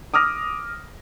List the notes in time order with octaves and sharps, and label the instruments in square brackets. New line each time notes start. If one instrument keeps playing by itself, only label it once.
[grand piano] D6 D#6 F6 A#6